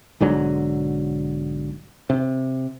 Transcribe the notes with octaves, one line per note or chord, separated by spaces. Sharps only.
B1 G#2 D3 F#3
C3